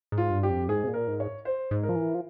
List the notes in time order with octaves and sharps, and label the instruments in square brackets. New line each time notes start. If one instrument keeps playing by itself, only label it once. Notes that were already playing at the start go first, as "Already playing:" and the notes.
[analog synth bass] G#2
[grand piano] F4
[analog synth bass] G2
[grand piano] G4
[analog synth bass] F2
[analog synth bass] G#2 [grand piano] G#4
[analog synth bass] C3
A#2
[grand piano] A#4
[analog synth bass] G#2
[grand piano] C#5
C5
[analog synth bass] G#2
[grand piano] A#4
[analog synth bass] F3
E3
F3